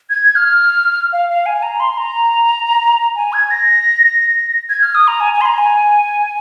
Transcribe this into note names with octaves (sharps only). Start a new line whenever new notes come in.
G#6
F6
F5
F5
G#5
A#5
C6
A#5
G#5
G#6
A#6
G#6
F6
D#6
A#5
G#5
G#5
C6
A#5
G#5